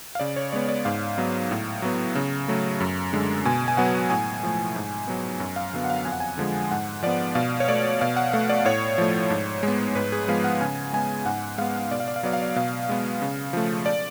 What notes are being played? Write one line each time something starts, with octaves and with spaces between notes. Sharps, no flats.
F5
C#3 D5
C#5
G#3 B3 D5
D5
G#2 F5
F#3 B3
A2
F#3 B3
C#3
F#3 A3
F#2
D3 G#3
B2 G#5
G#5
F#3 B3 F#5
A2 G#5
F3 A3
G#2
F#3 B3
F#2
F5
D3 F#3 B3
F#5
F5
F2 G#5
F#5
G#5
D3 F3 G#3
G#2 F#5
F3 B3 D5
B2 F5
C#5
A3 D5
B2 F5
F#5
A3 F5
D5
A2 C#5
F3 A3
G#2
G#3
B3
G#2 B4
G#4
F3 G#3 B3 F5
F#5
C#3 G#5
G#3 B3 G#5
G#2 F#5
G#3 B3 F5
B2 D5
F5
D5
F5
F#3 B3 D5
F5
D5
B2 F5
G#3 B3
C#3
F3 A3
D5